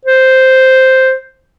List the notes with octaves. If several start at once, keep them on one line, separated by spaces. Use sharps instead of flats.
C5